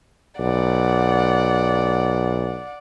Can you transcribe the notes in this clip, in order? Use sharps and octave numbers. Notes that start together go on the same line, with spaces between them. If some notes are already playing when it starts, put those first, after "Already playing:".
B1 D5 F#5